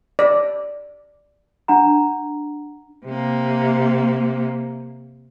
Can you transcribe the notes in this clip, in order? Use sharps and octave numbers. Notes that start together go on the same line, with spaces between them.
D5
D4 F#5 A#5
C3 A#3